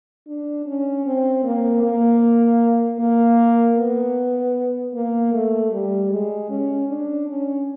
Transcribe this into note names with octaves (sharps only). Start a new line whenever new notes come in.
D4
C#4
C4
A#3
A#3
A#3
B3
A#3
A3
G3
G#3
C#4
D4
C#4